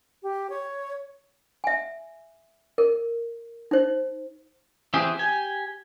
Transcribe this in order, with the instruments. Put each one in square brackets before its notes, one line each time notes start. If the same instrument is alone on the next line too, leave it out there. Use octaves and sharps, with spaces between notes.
[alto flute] G4
C#5
[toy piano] E5 G#5
A#4
D#4 C5
[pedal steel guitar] E3 C4 G4 G#4
G4 G#5